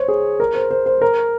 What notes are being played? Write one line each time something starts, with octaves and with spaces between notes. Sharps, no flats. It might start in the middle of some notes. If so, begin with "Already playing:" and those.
Already playing: C5 C#5
G#4
A#4
C5
C5
C5
A#4